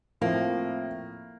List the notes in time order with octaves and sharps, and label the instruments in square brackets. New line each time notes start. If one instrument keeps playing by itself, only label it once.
[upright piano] A2 F3 C4 [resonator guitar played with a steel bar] A#3